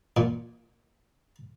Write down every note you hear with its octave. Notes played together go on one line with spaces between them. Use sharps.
A#2